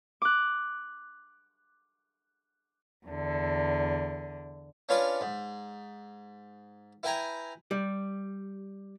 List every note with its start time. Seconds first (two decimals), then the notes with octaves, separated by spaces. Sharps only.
0.22 D6 F#6
3.07 E2 D3
4.89 C#4 D4 F4 B4 C#5 D5
5.21 G#2
7.03 E4 B4 G5 G#5 A#5
7.71 G3